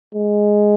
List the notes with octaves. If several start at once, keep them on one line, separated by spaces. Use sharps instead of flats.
G#3